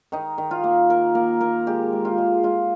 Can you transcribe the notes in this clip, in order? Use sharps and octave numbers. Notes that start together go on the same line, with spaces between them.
D#3 D#4
D#3
F4
A#3
A#3 A#4
A#3 A#4
A#3 A#4
G#3 G4
G#3
F4
G#3
G#3 F4